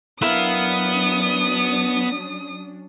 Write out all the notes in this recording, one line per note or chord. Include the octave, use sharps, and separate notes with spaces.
F#3 B3 C#4 D4 E4 A#4 F5 D#6